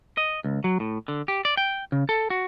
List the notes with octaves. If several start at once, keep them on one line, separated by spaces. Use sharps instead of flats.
D#5
C#2
F#3
A2
D3
G4
D5
G5
C#3
A4
F#4